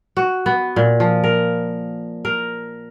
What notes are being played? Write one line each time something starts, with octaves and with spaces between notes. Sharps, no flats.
F#4
B3
A#2
F3
A#4
A#4